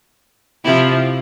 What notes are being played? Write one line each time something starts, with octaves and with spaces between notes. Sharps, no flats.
C3 F3 E4 G4